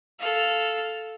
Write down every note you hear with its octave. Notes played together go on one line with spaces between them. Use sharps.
A4 F5